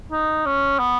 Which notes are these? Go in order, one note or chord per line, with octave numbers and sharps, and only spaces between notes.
D#4
C#4
B3